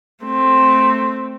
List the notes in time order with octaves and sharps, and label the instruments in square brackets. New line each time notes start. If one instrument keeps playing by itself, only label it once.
[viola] A3 C4